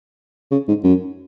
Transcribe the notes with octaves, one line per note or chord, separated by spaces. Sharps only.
C#3
G#2
F#2